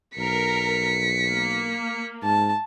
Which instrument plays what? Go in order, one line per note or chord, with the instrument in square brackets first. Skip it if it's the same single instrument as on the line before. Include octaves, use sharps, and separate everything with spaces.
[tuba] B1 [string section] A#4 [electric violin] B6 C#7
[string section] A#3
[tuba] G#2 [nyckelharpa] A5